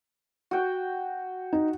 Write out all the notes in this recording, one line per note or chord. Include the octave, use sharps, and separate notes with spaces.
F#4 G5
D#4